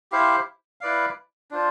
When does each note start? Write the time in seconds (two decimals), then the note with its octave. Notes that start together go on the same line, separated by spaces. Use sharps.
0.12 E4 G4 C5 F5
0.81 E4 B4 D5 F5
1.51 D4 F4 C5